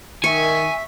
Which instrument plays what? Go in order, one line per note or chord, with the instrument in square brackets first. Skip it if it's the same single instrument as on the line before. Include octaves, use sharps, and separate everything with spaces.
[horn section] D#3 [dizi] E5 [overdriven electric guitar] G#5 [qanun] C#6